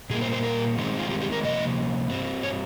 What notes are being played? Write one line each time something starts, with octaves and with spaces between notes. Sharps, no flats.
A#2 G3 A#3 G#4
C5
C5
A#4
G2 D#3 G#3 C4
F4
G4
G4
A#4
C3 F3 A#3 D#5
G2 G3 C4
C#5